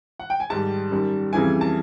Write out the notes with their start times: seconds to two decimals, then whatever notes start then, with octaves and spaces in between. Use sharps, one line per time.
0.20 F#5
0.30 G5
0.40 G#5
0.50 G#2 D#3 G3 A5
0.91 F#2 D#3 G3
1.33 F2 C#3 E3 G3 G#5
1.61 A5